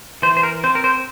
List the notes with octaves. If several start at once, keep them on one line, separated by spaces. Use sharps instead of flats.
E3 C5
C5
A#4
C4 C5
A#4
C5